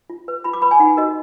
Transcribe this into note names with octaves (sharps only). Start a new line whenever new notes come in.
F4
B4
F4 B5
D6
B4 B5
G#5
D#4 F#5
F#4 A#4 D#5